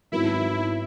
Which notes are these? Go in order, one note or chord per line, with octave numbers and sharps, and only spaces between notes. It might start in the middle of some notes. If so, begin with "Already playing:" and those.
G#1 G#2 F#3 B3 E4 F#4